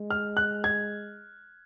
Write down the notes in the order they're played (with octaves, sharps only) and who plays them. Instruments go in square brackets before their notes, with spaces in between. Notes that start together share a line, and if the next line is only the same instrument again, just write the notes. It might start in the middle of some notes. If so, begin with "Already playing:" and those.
Already playing: [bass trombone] G#3
[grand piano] F6
F#6
G#6